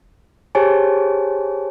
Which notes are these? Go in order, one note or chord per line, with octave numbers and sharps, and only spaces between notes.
G4 G#4 C5 C#5 G#5 A5